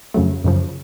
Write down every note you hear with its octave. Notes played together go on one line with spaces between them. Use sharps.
F2 C#3 F#3 A3
F#2 C#3 F3